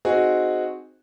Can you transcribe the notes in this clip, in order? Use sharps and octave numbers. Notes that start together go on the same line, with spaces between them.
C4 D#4 F#4 G#4